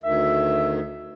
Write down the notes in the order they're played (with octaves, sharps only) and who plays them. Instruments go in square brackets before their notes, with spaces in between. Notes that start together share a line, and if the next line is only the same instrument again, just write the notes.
[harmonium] D2 D#3 [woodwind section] E5